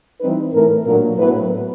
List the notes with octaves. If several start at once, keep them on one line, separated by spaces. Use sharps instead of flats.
E3 G3 C4 D#4 B4
A2 E3 A3 A#4
A#2 F#3 A#3 D4 A#4
A2 F#3 B3 B4